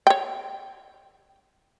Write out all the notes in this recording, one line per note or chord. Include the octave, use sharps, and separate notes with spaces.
C#5 G5